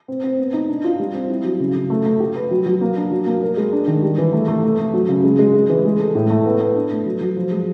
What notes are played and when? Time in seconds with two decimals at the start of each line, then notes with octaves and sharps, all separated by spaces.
0.08 C4
0.24 C4
0.39 B3
0.53 D#4
0.69 D4
0.84 F4
0.99 G3
1.14 C4
1.29 E4
1.44 F#3
1.60 C#3
1.75 C#3
1.90 A3
2.06 A3
2.20 G4
2.36 B4
2.51 F#3
2.66 F#3
2.81 A#3
2.96 D4
3.11 F#3
3.26 A#3
3.42 A#4
3.57 G#3
3.72 D4
3.87 D#3
4.02 G3
4.18 E3
4.32 A3
4.48 A3
4.63 A3
4.79 A3
4.93 F#3
5.09 C#3
5.24 G#3
5.39 G#3
5.54 G#3
5.69 E3
5.84 G#3
6.00 A4
6.15 A2
6.30 A3
6.45 B3
6.60 B3
6.75 D4
6.91 A3
7.06 F#3
7.21 F#3
7.36 F3
7.51 G#3